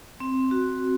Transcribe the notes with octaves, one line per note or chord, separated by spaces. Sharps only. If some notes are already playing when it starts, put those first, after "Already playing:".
C4
F#4